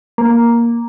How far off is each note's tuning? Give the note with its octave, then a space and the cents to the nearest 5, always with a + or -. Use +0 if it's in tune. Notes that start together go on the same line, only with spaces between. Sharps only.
A#3 +5